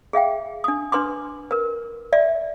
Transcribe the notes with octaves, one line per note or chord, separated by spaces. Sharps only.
G#4 E5 F5 G5
D4 D#6
D4 B4 C6 D6
A#4 B4
D5 E5